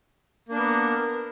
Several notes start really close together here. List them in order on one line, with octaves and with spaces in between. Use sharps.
A#3 D4 A#4 B3